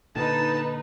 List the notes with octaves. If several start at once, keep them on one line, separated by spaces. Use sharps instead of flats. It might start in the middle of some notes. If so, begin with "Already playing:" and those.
A#2 D3 D#4 B4 A5